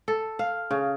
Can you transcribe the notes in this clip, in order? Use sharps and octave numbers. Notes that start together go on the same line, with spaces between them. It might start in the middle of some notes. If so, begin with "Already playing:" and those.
A4
F5
C#3